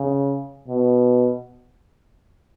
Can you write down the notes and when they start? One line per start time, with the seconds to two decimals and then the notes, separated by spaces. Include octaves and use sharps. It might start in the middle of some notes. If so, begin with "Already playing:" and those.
Already playing: C#3
0.68 B2